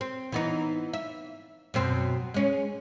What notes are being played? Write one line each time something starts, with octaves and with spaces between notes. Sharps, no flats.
C4
E3 B3 D#4
E5
F#2 B2 C4
G#3 C#4